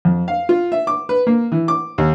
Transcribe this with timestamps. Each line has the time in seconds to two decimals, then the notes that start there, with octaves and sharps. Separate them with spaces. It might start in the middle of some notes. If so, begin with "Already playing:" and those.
0.05 F2
0.28 F5
0.49 F4
0.72 E5
0.87 D6
1.09 B4
1.27 A#3
1.52 E3
1.68 D6
1.98 D#2